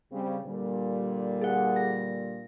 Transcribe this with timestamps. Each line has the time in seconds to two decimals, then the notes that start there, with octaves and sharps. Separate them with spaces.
0.12 C#3 G3 C4
0.44 A#2 D3 G3
1.41 G#4 F#5
1.76 A#6